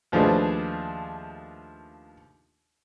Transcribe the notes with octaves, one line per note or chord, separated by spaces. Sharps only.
D#2 F3 A3 D4 G#4 B4